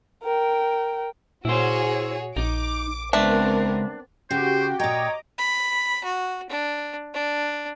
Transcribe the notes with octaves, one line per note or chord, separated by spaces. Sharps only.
A#4 G5
A#2 E4 F#4 G#4 C5 C#5
A#1 D#4 D6
C#2 G#3 B3 C4 D4 A#4 E5
C#3 F#4 G4 C5 G5
A#2 C#5 D#5 G5 A#5 D6
B5
F#4
D4
D4